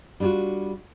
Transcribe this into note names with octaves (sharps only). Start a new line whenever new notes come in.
G3 D4 D#4 F4 F#4